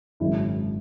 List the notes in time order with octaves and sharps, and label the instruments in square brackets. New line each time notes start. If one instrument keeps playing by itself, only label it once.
[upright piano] G#1 F#2 C#3 E4